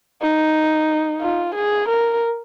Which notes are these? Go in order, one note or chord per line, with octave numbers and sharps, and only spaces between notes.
D#4
F4
G#4
A#4